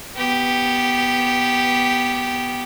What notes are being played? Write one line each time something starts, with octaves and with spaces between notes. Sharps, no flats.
B3 G4